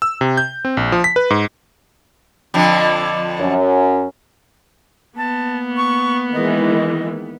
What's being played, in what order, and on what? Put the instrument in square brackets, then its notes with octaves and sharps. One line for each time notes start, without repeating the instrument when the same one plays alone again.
[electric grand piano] E6
C3
G6
C4
A#1
F3
B6
B4
G#2
[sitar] F2 D3 F3
[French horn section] F#2 C#4
[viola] A#3 B3 [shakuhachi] A5
[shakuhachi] C#6
[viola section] D#3 E3 G#3 [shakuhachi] D#5